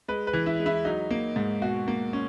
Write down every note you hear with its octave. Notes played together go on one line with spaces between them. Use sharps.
G#3 B4
B4
E3
E4
G#3
E4
F#3 D#4
A#3
G#2
B2 F#4
A#3
C#4